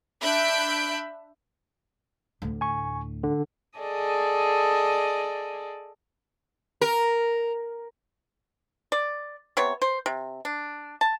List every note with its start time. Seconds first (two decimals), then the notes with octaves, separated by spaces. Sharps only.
0.23 D4 E5 B5 F#6 G6 D7
2.42 D2 A2
2.61 G#5 C#6
3.23 D3
3.79 G#4 A4 D5 D#5
6.81 A#4
8.92 D5
9.57 C3 B3 C#5
9.82 C5
10.06 C3
10.45 D4
11.01 A5